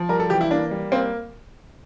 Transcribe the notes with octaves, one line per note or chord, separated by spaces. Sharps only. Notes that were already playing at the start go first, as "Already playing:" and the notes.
Already playing: F3
G3 A#4
A4
E3 G4
E4
A#3 D4
G3
A#3 C4